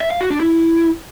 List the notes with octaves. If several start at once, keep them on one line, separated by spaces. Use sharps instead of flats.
E5
F5
F#4
D4
E4